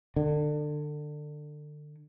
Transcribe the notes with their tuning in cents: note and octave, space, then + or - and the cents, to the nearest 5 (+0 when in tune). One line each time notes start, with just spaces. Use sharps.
D3 +25